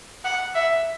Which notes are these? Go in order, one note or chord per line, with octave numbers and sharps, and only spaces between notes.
F#5
E5